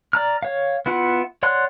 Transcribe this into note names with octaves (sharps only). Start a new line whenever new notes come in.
D5 A#5 F6
C#5 F5
B3 E4 F4 F#5
C#5 D5 F#5 C6 F#6